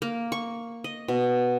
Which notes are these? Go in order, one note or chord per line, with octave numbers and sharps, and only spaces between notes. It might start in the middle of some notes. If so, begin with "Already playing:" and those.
A#3
C#6
D#5
B2